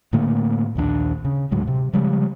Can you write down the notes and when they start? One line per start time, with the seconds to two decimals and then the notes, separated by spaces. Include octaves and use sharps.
0.13 A2 D3 A3 A#3
0.75 A#1 D#2 D#3 D4
1.25 C#3
1.51 D2 A2 F#3 G#3
1.67 C3
1.93 C#3 F3 G3 G#3